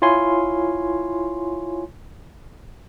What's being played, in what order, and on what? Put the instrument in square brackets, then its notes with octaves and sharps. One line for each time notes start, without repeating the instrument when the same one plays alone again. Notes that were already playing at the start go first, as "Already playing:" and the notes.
[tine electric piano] E4 F4 C#5 G#5 C6